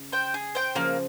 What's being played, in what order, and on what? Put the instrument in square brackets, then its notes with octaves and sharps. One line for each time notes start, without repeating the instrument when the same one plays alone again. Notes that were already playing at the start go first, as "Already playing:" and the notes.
Already playing: [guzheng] C#3
[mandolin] C5 G5
G#4
C5 G5
[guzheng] C#3 F3 [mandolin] A#3